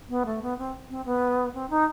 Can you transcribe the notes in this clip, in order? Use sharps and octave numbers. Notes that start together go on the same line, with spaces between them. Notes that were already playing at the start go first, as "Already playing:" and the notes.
B3
A3
B3
C4
C4
B3
C4
D#4